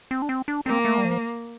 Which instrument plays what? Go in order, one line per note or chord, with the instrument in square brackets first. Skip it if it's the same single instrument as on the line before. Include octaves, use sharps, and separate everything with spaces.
[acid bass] C4
D4
C4
D4
[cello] A#3 [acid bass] C4
[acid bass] A3
G3
F3